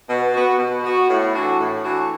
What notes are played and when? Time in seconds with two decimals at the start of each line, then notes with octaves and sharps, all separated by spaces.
0.09 B2
0.33 B3 F#4
0.58 B2
0.84 B3 F#4
1.09 A2
1.34 E3 D4 F#4
1.59 A2
1.84 E3 D4 F#4